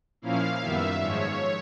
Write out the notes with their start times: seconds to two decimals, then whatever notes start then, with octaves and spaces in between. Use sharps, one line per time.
0.22 A#2 F3 A#3 C#4 E4 F5
0.61 F#2 D#3 G3 B3 E5
1.01 G#2 F3 G#3 C#5